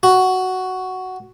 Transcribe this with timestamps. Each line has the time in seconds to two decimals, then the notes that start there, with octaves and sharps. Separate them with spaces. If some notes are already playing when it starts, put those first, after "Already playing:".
0.03 F#4